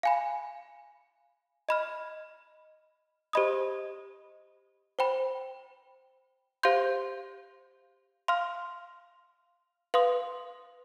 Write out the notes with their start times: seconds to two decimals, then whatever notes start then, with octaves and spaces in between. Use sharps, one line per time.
0.03 F5 G#5 B5
1.69 D#5 B5 F6
3.33 G4 C5 D#5 B5 D#6
4.99 C5 G5 B5
6.63 G4 C5 F5 C6 G6
8.28 F5 C6 F6
9.94 B4 F5 C6 D#6